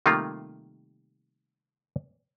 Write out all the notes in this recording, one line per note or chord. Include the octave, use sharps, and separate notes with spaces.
C3 D#3 G3 A3 A#3 F4